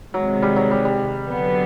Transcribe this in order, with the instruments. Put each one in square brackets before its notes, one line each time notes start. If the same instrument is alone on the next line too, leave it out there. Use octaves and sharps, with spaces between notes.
[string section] C3 D#3 G#3 [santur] F#3
[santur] G3
F#3
G3
G3
[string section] D3 F#3 B3